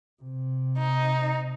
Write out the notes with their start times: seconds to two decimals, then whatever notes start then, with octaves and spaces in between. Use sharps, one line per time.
0.22 C3
0.78 D#4